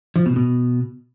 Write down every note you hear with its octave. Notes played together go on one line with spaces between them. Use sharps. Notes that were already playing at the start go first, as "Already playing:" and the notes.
F3
B2
B2